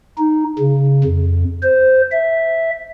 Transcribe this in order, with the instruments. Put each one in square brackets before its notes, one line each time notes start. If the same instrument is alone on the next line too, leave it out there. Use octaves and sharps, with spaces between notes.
[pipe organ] D#4
C#3
F2
C5
E5